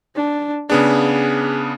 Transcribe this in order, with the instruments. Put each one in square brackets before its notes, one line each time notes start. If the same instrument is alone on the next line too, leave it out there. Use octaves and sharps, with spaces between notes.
[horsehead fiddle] D4
[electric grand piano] C#3 B3 D4 [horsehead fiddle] G#4